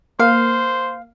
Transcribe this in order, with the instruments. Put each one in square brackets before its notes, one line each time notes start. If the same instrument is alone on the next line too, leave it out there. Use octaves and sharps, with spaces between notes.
[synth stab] A#3 [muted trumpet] C5 [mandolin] F5